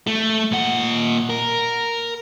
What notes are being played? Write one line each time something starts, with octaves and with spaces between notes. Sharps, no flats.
A3
A#2 F#5
A#4